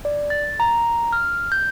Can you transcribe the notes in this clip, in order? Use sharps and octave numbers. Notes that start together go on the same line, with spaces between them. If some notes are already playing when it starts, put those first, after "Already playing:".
D5
A6
A#5
F6
G6